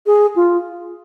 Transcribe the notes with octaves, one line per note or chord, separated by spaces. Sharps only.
G#4
F4